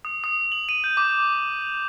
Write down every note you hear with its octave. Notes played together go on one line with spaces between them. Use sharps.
D#6
D#6
F#7
D#7
G6
D6
F7